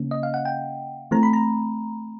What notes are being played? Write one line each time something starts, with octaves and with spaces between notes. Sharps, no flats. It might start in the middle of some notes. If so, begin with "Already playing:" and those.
Already playing: C#3 A#3 C#4
D#5
F5
F#5
G5
E3 A3 C4 A#5
B5
A#5